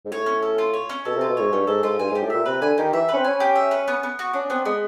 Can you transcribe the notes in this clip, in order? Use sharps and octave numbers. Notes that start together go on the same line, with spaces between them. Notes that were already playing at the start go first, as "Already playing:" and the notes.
G#2
A2 C#5
C#4
A4
F4
C#5
C#4
B2 A4
C3
F4
B2
G#2 C#5
G2 C#4
G#2 A4
G#2 F4
G2 G#5
G#2
G4
A2
A#2 E5
C3 B4
D3 G#5
D#3 G4
E3 E5
C#4 B4
C4
C#4 G#5
G4
E5
B4
B3
B3
F#4
C#4 D4
B3 C4
G#3 B3